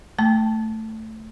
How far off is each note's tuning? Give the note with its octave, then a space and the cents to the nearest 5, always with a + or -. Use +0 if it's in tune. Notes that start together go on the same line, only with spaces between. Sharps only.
A3 +5 A5 +0